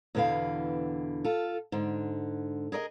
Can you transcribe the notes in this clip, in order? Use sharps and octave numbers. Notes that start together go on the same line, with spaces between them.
E2 B2 D3 E3 F5
F4 A4
G#2 D3
G#4 A#4 D5 D#5